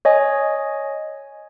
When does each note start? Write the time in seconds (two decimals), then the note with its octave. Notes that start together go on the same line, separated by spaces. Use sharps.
0.05 C#5 D#5 G#5